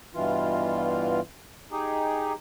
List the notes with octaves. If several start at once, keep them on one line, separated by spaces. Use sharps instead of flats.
G2 B2 E3 F4
D#4 G4 G#4